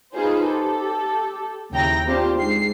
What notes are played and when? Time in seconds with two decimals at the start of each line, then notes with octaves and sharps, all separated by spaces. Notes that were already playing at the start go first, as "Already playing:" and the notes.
0.16 D#4 F4 G#4 B4 C5
0.48 G4 A4
1.72 D#2 C#3 E4 G5 A#5 A#6
2.06 C4 D4 F4 G4 C5
2.37 G#2 C7